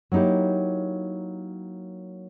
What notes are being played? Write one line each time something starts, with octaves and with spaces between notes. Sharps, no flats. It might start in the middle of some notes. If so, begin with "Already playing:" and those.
F#3 A#3 D#4 E4 G4